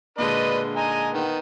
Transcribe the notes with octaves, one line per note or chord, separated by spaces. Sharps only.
A#2 D3 G#3 D4 B4 D#5
D#5 G#5 A#5
D#3 B3